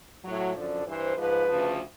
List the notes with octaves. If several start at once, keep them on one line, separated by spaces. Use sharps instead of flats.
A2 F#3
F#2 D3 F3 D5
G2 E3 C5
G#2 F3 B4
D2 C#3 F3